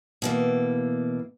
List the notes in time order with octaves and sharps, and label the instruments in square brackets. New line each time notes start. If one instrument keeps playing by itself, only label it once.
[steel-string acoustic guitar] B2 E3 A#3